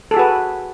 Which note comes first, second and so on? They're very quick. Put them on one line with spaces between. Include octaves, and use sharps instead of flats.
A4 G#4 F#4 B4